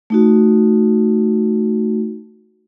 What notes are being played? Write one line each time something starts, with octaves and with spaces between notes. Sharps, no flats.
A3 D#4 F#4